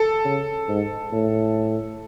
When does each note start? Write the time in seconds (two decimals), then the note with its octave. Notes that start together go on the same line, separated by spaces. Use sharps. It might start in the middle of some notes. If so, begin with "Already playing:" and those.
Already playing: A4
0.25 C#3
0.68 G#2
1.12 A2